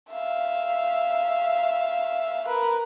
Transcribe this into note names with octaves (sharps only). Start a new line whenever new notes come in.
E5 F5
A#4 B4